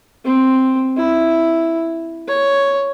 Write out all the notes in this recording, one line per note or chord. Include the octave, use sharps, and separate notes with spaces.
C4
E4
C#5